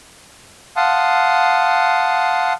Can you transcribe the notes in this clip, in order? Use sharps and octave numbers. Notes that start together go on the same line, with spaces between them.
F5 F#5 A5 C6 D#6